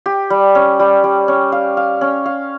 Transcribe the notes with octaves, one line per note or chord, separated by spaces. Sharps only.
G4
G3
C#4
G3
G3
C#4
F5
F5
C#4
F5